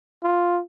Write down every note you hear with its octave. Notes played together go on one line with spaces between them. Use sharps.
F4